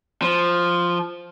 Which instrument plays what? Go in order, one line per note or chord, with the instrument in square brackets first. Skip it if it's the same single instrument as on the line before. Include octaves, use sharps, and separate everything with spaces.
[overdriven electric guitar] F3